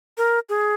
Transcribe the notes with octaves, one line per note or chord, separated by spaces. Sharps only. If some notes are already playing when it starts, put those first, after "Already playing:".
A#4
G#4